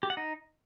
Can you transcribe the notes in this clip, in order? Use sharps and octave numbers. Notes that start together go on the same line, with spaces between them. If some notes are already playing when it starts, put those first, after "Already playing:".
G4
F#5
D#4